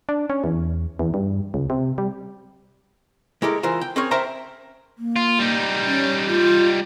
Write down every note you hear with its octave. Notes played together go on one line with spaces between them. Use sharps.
D4
C#4
E2
E2
G2
C#2
C3
G3
G#3 E4 G4 A4 A#4
E3 F4 A#4 C5
G5
C4 C#4 G#4 A#4 C#5
A#4 C5 E5 G5 A5 A#5
A#3
F4
G3 D#4
C#4
F4